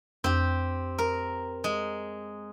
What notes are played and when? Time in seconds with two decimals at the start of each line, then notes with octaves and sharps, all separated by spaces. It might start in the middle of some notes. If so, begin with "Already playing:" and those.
0.24 F2 C4 G4
0.98 A#4
1.64 G#3